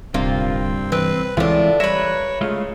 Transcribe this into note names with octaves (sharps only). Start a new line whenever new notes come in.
D1 G2 C3 A#3 C4 F4
E3 C4 B4
C#2 A2 E3 G#3 C4 D4 F4
G3 A#4 B4 C#5 E5
C#3 G#3 A3 F4